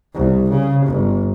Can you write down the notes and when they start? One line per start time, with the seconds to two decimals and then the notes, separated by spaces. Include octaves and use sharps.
0.15 C2
0.50 C#3
0.86 G1